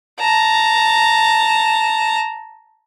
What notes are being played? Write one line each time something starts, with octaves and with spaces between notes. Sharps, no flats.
A5 A#5